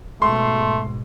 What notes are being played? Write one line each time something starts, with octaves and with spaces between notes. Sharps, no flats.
G#2 B2 A3 C6